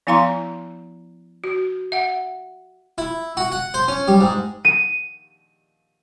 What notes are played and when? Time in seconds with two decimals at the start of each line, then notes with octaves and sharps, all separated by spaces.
0.07 F3 B3 E4 F5 A#5 C6
1.44 F#4
1.92 E5 F#5
2.98 E4
3.37 F#4
3.52 F#5
3.74 C5
3.88 C#4
4.08 G3
4.21 G#2
4.65 D#7